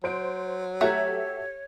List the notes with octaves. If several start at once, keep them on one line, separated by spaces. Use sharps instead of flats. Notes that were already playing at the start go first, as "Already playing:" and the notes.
F#3 C5 D7
A3 F#4 G4 A4 C#5 E5 A#5